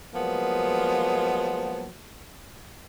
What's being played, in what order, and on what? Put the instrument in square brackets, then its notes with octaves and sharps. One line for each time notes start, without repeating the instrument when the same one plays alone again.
[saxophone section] F3 F#3 G#3 A#3 B3